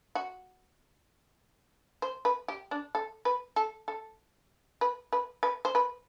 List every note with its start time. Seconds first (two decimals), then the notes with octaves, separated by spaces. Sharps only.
0.15 F#4
2.02 C5
2.25 B4
2.48 G4
2.71 D4
2.95 A4
3.25 B4
3.56 A4
3.88 A4
4.81 B4
5.13 B4
5.43 B4
5.65 C5
5.75 B4